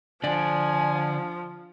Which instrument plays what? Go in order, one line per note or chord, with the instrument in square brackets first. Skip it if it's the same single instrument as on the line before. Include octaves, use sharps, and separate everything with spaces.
[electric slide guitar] D3 D5 [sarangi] F3 [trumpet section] G#5